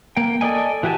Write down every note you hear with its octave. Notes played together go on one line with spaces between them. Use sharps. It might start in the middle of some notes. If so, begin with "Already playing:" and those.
A#3 G5
A4 D5 D#5 G#5
E3 F#4 G4 G#5 A5